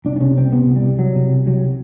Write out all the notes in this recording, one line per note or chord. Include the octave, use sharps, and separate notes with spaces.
C2 D4
D4
C3 C#4
C2 C4
C3 B3
C2
G3
C3
C2 F#3
C3
C2
C3 F#3